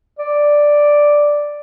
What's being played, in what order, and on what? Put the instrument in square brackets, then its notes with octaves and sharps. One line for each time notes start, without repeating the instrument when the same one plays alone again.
[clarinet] D5